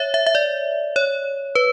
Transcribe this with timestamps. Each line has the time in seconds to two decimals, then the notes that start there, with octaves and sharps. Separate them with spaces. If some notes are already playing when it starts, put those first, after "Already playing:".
Already playing: C#5 E5
0.14 E5
0.26 E5
0.35 D5
0.96 C#5
1.55 B4